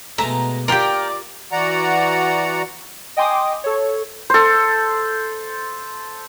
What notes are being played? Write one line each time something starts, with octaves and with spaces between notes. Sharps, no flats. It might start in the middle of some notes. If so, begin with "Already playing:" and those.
B2 G#3 A3 E5 A#5
A#3 F4 G4 A#4 D5 G5
E3 F#4 D5 F#5 A#5
D#5 G5 G#5 C6 D6 D#6
A4 C#5
A4 C5